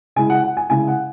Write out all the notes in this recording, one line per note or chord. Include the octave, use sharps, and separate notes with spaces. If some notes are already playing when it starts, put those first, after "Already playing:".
C#3 G#3 E4 G#5
F#5
F#5
G#5
C#3 G#3 E4 G#5
F#5